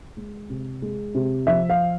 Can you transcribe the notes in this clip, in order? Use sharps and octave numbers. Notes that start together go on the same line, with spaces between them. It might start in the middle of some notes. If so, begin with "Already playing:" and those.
G#3
C3
G#3
C3
F3 E5
F5